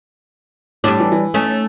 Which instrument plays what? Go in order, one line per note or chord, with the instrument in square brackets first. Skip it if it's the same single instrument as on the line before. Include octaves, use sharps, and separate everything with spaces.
[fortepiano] A2 [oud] G3 D4
[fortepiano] E3
E3
[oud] A3 C#4 D#4